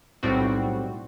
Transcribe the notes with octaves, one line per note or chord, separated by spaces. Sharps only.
B1 A2 G3 C4 F#4